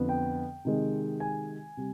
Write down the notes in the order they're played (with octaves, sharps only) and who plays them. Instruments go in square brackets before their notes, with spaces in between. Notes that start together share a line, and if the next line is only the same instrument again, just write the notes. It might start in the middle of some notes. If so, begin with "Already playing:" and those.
Already playing: [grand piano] F2 D3 F3 B3
G5
C3 D#3 G#3
G#5
C3 G3